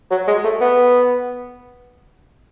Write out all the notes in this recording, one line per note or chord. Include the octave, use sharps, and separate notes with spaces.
F#3
G#3
A3
B3